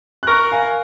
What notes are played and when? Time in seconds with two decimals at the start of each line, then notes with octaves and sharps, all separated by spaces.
0.23 F#6
0.27 A#4 C#6 F6
0.52 F5 G#5